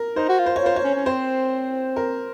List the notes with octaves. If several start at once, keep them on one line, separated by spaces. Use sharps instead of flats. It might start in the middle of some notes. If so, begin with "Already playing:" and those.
Already playing: A#4
D#4 C5
F#4
F4
C5
F4 C#5
C5
C#5
C#4
C#4
C4 C5
A#4